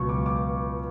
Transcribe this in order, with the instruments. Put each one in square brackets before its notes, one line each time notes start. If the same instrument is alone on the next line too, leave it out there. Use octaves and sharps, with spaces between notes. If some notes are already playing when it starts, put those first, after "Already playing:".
Already playing: [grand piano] C#2 B2 F#3 C#6
D6
D6